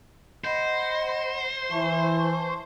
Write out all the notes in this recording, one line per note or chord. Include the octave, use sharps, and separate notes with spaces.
C5 D#5 F#5 B5
E3 A5 C6 C#6